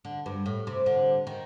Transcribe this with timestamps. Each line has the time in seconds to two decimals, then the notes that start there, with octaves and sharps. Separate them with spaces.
0.05 D3
0.26 G2
0.46 A2
0.67 C3
0.86 D3
1.27 D#3